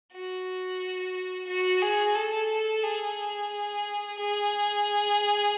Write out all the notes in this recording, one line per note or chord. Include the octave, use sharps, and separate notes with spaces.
F#4
F#4
G#4
A4
G#4
G#4